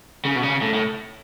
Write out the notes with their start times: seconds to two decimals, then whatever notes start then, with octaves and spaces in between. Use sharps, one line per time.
0.25 C#3
0.36 B2
0.43 C#3
0.61 A2
0.74 A2